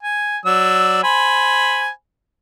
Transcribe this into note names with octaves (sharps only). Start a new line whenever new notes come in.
G#5
F#3 D5 E6
C5 G#5 B5